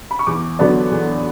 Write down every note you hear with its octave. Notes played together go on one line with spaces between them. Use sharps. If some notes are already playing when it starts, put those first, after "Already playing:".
B5
C#6
E2 D6
D3 F#3 B3 D4
E2